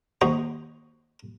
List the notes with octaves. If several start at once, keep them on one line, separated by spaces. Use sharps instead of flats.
D#2 D#4 F#4 C5 A#5 D#6